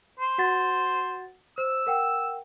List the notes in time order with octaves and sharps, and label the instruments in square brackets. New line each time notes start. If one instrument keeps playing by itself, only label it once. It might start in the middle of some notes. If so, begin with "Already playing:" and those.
[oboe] C5
[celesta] F#4 F#5 A6
[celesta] C5 [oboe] E6
[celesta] A#4 F#5 G5